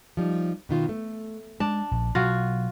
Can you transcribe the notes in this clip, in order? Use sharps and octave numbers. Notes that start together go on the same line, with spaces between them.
F3 G3 D#4
B2 D#3 F4
A3
G#3 D4 A5
A#1
B2 F#3 F4 F#4